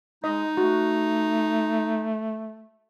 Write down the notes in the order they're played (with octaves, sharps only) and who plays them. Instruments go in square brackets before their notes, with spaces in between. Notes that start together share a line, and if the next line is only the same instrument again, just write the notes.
[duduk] G#3 [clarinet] D#4 [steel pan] D#5
[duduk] A3 [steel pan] F#4